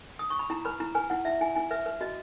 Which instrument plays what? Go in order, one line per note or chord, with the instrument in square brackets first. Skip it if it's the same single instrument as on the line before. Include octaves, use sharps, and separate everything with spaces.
[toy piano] D#6
C#6
B5
E4 A#5
B4 B5
E4 A#5
B4 G#5
E4 F#5
E4 E5
E4 G#5
E4 G#5
B4 E5
B4
F#4 D#5